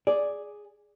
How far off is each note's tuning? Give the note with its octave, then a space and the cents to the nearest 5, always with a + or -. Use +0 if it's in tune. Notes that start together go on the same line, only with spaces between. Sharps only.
G#4 +0 D5 +0